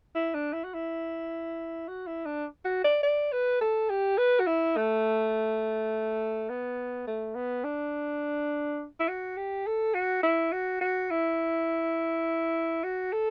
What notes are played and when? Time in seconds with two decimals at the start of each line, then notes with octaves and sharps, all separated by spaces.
0.15 E4
0.34 D4
0.53 E4
0.64 F#4
0.74 E4
1.88 F#4
2.07 E4
2.25 D4
2.65 F#4
2.84 D5
3.03 D5
3.32 B4
3.61 A4
3.90 G4
4.18 B4
4.40 F#4
4.47 E4
4.76 A3
6.49 B3
7.07 A3
7.35 B3
7.64 D4
9.00 E4
9.08 F#4
9.37 G4
9.67 A4
9.94 F#4
10.23 E4
10.52 F#4
10.81 F#4
11.11 E4
12.84 F#4
13.13 A4